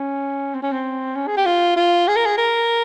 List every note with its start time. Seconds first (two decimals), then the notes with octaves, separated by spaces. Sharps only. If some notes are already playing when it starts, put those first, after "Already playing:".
Already playing: C#4
0.55 C4
0.63 C#4
0.72 C4
1.16 C#4
1.28 G#4
1.37 G4
1.46 F4
1.77 F4
2.08 G#4
2.17 A#4
2.26 G#4
2.38 A#4